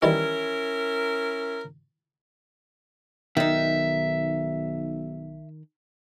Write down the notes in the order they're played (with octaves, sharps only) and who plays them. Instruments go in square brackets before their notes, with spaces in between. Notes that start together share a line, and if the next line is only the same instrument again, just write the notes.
[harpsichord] D#3 E3 G3 [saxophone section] C#4 E4 A#4
[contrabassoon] B1 [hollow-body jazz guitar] D#3 D#4 [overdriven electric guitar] E5